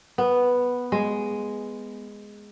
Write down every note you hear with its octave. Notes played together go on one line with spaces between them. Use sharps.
B3
G#3